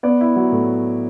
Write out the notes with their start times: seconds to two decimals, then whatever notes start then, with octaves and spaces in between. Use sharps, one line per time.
0.03 B3 D5
0.21 E4
0.36 F#3
0.52 A2